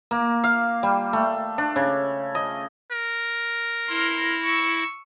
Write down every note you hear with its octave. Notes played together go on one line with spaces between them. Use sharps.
A#3
F5
G3
A3
D4
C#3
D#5
A#4
E4 C6 F6 A#6
C#6 E6